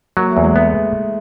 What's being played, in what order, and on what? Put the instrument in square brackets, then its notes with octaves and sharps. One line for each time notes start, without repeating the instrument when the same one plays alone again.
[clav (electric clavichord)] F#3 [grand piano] A#3
[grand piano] A3
[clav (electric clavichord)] E2
[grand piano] G#3
[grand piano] A3 [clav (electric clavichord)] B3